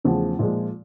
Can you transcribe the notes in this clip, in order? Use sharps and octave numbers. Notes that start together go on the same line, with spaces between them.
E2 C#3 F3 A3
A#2 F3 G#3